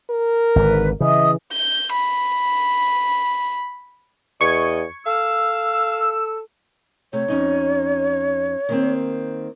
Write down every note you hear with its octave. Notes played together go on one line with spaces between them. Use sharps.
A#4
G#1 G#2 D3 B4
C#3 E3 D#5 E5 D#6
G6
B5
E2 D#5 C#6 G#6 C#7
A4 F5 E6
C3 A3 C#5
F2 C#4 D#4
D#3 A#3 C4